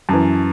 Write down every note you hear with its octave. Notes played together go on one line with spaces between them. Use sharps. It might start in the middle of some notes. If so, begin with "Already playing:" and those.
F#2 E3 A5